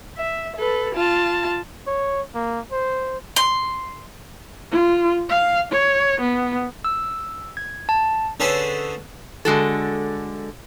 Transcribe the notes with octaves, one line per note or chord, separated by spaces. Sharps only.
E5
A4 B4
F4 A5
C#5
A#3
C5
C6
F4
F5
C#5
B3
E6
G#6
A5
D3 C#4 G#4 A4 B4 C5
D3 G#3 F#4 A4